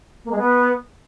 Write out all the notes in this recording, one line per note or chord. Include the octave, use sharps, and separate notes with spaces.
A#3
G#3
B3